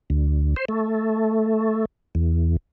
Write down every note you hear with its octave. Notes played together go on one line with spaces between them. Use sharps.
D2
C5
A3
E2